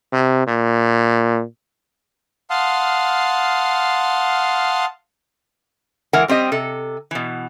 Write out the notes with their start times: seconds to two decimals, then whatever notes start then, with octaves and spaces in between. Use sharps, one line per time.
0.13 C3
0.48 A#2
2.50 F5 F#5 A5 C6 D#6 F6
6.13 E3 G#3 A#4 F#5
6.28 G3 C4 G4 D#5
6.52 C3 A4
7.11 B2 E3